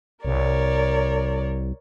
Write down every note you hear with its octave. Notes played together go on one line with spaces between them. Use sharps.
C2 A#4 C#5 D5